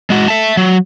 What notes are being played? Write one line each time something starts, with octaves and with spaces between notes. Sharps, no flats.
G#3 F#4
E5 A5
F#3